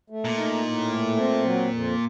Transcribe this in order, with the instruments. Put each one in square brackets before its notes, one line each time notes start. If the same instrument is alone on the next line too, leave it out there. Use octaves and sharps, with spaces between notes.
[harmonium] A3
[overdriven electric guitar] A#2
[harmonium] D#4
A2
A3
C4
F#3
F2